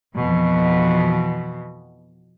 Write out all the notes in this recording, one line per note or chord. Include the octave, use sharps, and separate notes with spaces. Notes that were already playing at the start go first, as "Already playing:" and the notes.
F2 B2 E3